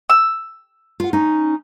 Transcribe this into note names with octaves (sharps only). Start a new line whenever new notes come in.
E6
F4 F#5
C#4 D#4